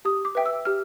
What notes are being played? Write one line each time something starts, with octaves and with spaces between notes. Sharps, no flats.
G4 D#6
D6
B4 E5 G5
E6
G4 F6